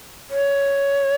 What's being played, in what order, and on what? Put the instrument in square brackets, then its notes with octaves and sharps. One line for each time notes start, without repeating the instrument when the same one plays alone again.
[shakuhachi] C#5